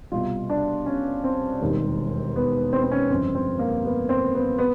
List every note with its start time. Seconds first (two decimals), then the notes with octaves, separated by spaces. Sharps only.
0.12 C2 B2 G3 F4
0.50 D4
0.86 C#4
1.24 C4
1.62 E1 D#2 D#3 G3
2.36 B3
2.73 C4
2.83 C4
2.92 C#4
3.10 G1 F2 C#3 C4
3.35 C4
3.59 A#3
3.85 B3
4.09 C4
4.35 B3
4.58 B3